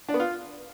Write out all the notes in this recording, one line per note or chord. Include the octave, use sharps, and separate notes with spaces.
D4
B3
F4